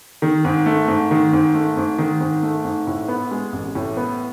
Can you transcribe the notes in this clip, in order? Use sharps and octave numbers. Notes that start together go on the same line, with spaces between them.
D#3
G#2
A3
G#2
D#3
G#2
A3
G#2
D#3
G#2
A3
G#2
A2
B3
G#3
A1
A2
B3